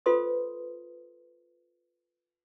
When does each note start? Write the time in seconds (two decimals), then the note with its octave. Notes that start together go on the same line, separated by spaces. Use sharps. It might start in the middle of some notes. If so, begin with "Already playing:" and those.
0.06 F4 A4 B4 C5 C6 D#6